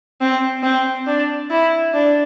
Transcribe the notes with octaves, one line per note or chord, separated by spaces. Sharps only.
C4
C4
D4
E4
D4